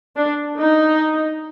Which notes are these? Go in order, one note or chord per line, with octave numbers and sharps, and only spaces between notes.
D4
D#4